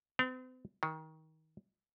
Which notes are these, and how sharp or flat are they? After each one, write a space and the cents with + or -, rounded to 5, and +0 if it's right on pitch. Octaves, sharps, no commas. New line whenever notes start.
C4 -45
D#3 +25